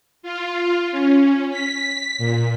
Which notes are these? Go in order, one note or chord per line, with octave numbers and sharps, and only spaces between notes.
F4
C#4
B6
A#2